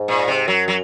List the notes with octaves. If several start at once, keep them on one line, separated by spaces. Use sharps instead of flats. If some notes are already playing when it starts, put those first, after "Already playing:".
Already playing: G#2
A#2
C3
F#2 F#3
F#3